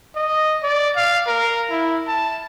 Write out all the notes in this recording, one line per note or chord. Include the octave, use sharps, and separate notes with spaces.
D#5
D5
F5
A#4
E4
A5